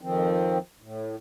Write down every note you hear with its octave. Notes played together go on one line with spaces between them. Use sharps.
F2 D#3 F3 C4
A2